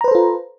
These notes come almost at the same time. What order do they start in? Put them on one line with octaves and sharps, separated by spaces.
A#5 B4 C5 A4 F4